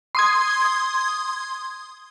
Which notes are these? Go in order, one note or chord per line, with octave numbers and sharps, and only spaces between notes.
C6 D#6 G#6